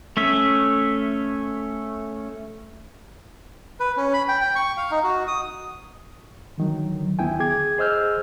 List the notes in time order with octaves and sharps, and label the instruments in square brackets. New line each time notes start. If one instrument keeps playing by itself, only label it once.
[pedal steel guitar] A3 C#4 E5
[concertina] B4
C#4
B5
G5
G5
C#6
F5
D#4
F#4
D#6
[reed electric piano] D3 D#3 F#3
D2 B3 E4 G5 G#5
G#4 D6 G#6
G#4 C5 D#5 E6 F6 G6